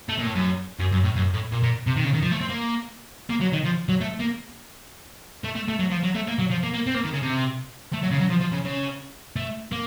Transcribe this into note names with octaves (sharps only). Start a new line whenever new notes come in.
A3
A#2
A2
F#2
F#2
F#2
A2
F#2
A2
A#2
A#2
C3
D#3
C#3
D#3
F3
A3
C4
A#3
A#3
F#3
D#3
F3
F#3
A3
A#3
A3
A3
A3
F#3
F3
F#3
A3
A#3
F#3
F3
A#3
A#3
C4
A#3
D#3
C#3
C3
A3
F#3
C#3
F#3
F3
F3
C#3
C#3
A3
A#3